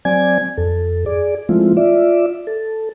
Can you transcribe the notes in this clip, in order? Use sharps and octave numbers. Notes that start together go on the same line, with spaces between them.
F#3 C4 D5 G#5 G#6
F2 A4
G#4 D5
F3 G#3 A3 C4 E4 F4
F4 D5 E5
A4